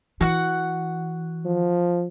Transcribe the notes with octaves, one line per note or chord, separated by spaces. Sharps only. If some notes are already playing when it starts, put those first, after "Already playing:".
E3 F#4 F#5
F3